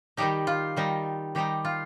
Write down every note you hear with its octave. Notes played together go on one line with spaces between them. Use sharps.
D#3 G3 D#4 G4
F4
D#3 G3 D#4
D#3 G3 D#4 G4
F4